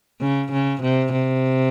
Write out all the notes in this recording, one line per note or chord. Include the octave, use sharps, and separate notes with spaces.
C#3
C#3
C3
C3